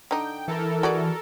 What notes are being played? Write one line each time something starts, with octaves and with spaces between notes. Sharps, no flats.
D3 D#4 G5
E3 A4 A#4
F#4 G#4 D5